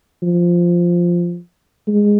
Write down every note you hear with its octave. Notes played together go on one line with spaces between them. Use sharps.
F3
G#3